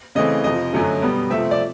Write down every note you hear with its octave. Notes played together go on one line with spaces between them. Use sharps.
C#3 E3 A3 C4 D#5
F2 C3 F3 D#5
F#2 D3 F#3 A3 C#4
B2 G3 B3
C3 F3 A3 C4 E5
D5